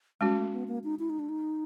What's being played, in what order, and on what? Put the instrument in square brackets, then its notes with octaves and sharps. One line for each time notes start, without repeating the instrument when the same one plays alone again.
[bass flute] G3 [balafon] G#3 C#4 F#4
[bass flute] A3
B3
A#3
D#4
E4
D#4
D4
D#4